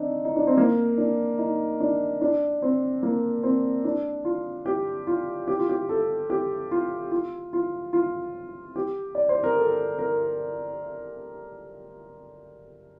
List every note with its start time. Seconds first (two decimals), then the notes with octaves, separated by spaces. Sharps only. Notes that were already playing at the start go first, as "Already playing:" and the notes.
Already playing: C4 D4 D#4
0.25 D#4
0.36 D4
0.47 C4
0.57 A#3
0.98 D4
1.38 D#4
1.80 D4
2.21 D4
2.62 C4
3.03 A#3
3.43 C4
3.84 D4
4.25 F4
4.66 G4
5.07 F4
5.48 G4
5.59 F4
5.69 G4
5.89 A4
6.30 G4
6.71 F4
7.12 F4
7.53 F4
7.93 F4
8.76 G4
9.15 D5
9.29 C5
9.44 A#4
9.58 A4
9.99 A#4